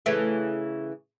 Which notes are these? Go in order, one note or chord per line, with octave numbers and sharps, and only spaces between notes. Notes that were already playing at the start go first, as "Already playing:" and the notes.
C#3 E3 A3